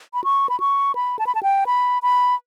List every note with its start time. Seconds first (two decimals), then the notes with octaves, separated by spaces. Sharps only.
0.14 B5
0.24 C#6
0.49 B5
0.60 C#6
0.95 B5
1.19 A5
1.27 B5
1.35 A5
1.43 G5
1.66 B5
2.02 B5